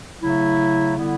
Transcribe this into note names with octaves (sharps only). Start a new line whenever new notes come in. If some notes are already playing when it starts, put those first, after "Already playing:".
C#3 F#3 A3 E4
D3 G3 B3 E4